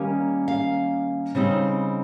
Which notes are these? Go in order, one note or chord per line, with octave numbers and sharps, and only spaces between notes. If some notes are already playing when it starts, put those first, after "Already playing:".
Already playing: D#3 G3 A#3 C#4
F5
C#3 G3 C4 D#4